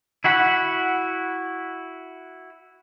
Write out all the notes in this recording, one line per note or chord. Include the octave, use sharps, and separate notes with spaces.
E4 F#4 F#5 B5